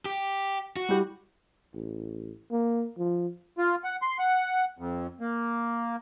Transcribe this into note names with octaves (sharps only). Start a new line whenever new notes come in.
G4
F#4
G3 E4 G4
A1
A#3
F3
F4
F#5
C6
F#5
F2
A#3